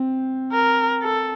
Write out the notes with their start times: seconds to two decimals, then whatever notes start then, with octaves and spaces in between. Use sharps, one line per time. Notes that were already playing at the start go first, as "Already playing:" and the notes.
Already playing: C4
0.52 A#4
1.03 A4